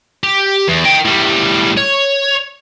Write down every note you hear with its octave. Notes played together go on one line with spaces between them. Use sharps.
G4
E2
D#5 G5
A2 G3
C#5